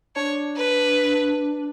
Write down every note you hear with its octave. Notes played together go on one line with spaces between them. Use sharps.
D4 C#5
B4